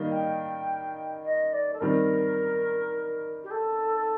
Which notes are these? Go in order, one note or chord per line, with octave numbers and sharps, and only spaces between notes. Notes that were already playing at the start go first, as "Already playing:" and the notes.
Already playing: D#3 G3 A#3 D#4
G5
D#5
D5
A4
D#3 G3 C4 A#4
G4
A4